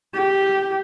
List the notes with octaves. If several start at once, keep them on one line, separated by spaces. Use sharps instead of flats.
G4